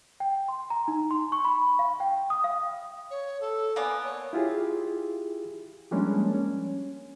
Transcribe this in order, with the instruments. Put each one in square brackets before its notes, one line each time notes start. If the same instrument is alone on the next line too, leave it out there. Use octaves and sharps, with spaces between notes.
[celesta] G5
C6
A#5
D#4
C6
C#6
B5
F5
G5
D#6
F5
[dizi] C#5
A4
[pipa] A#3 B3 D5 [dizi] G#5
[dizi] C#5
[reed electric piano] E4 F4 G4 G#4
F3 G3 G#3 A#3 C#4 D4
C#4